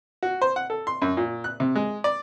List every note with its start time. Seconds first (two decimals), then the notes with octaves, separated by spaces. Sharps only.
0.23 F#4
0.42 C5
0.56 F#5
0.70 A4
0.87 C6
1.02 F#2
1.17 A#2
1.44 F#6
1.60 C3
1.75 G#3
2.04 D5